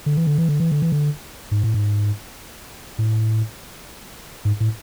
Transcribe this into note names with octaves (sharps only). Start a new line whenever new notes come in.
D3
E3
D3
E3
D3
E3
D3
E3
D3
G#2
A2
G#2
A2
G#2
A2